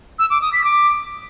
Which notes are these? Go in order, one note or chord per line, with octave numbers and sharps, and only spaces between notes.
E6
D6
D#6
B6
D6